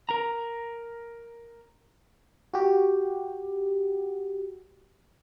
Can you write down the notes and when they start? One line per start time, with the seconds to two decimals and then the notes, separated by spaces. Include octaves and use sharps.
0.09 A#4 A#5
2.53 F#4 G4